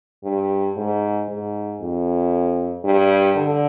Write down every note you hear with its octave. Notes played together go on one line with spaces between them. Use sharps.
G2
G#2
G#2
F2
G2
D3